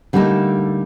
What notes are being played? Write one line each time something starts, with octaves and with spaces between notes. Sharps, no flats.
D3 G3 A3 A#3 D#4 A4